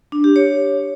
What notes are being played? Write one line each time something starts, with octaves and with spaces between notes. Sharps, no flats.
D4
G4
C#5